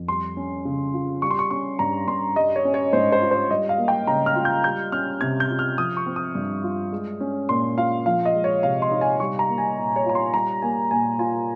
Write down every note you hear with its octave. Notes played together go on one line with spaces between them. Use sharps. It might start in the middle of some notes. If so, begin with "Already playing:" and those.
Already playing: F2
G3 C6
C#4
C#3
F4
G3 C#6
C6
C#6
C#4 C#6
G2 A#5
G2 C6
G3 D#5
C#5
C#4
C#5
G#2 C5
C5
F4
C5
G3 D#5
F5
A#3
G5
C#3 A#5
F6
F4
G6
G3 G6
C#4 F6
C3 G#6
G6
F4
F6
F3 D#6
C#6
C4
D#6
G2
F4
G#3
C#4
A#2 C6
F4 F5
F3 F5
D#5
G#3
C#5
C3 F5
C6
D#4
G#5
G3 C#6
A#5
A#3
G#5
A#2
C#5
F4 A#5
C6
G3 A#5
A#3 G#5
A#2 G#5
F4 G#5